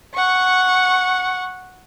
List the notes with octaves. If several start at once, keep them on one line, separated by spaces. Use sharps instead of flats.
F#5 C#6